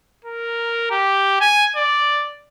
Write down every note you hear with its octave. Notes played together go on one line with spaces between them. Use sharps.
A#4
G4
G#5
D5